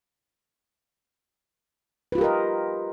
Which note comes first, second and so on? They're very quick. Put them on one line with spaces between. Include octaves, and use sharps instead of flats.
B4 F4 G4 A#4 D#5